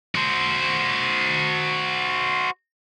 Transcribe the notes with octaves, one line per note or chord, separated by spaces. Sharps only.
F#4 C5